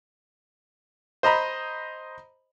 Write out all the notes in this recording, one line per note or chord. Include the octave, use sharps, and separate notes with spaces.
C5 D#5 A#5 B5